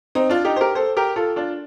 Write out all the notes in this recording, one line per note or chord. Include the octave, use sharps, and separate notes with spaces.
C4 D#4
D4 F4
D#4 G4
C5
G4 A#4
A4 C5
G4 A#4
F4 A4
D4 F4